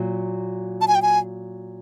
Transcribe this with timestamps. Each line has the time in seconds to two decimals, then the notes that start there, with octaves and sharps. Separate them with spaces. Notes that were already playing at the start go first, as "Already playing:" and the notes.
Already playing: A#2 F#3
0.81 A5
0.88 G#5
0.95 G5
1.02 G#5